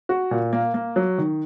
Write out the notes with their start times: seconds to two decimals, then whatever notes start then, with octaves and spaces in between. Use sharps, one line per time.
0.09 F#4
0.31 A#2
0.53 A#3
0.74 A#3
0.96 F#3
1.18 D#3